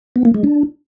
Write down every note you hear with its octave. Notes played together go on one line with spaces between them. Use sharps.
B3
A#3
G#3
D4